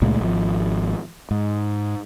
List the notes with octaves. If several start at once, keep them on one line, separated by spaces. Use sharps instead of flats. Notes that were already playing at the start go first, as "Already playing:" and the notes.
C#2 A#2 G#3 A3
G#1 F3
G#2